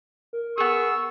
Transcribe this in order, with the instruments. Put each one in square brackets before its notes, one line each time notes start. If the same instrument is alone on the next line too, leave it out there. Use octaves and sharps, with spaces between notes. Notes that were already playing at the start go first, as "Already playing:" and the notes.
[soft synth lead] A#4
[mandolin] B3 G#4 [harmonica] C#6 E6